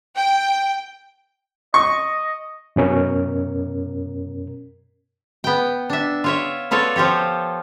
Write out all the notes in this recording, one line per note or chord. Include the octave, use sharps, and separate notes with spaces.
G5
D#5 C#6
F#2 B2 C#4 A#4
B3 G5
D4 E5
F4 C#5 E5
B3 F4 A4 C#5 D5
F3 F4 G4 C#5